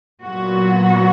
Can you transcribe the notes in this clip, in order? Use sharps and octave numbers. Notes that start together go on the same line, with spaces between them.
A#2 F#3 B3 F#4